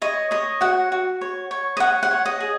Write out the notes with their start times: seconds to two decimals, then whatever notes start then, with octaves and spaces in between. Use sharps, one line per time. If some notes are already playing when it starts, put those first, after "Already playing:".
0.02 C#5 D#5
0.31 C#5 D#5
0.61 F#4 F#5
0.92 F#4
1.21 C#5
1.51 C#5
1.77 D#5
1.80 C#5 F#5
2.03 F#5
2.11 C#5
2.26 D#5
2.40 G#4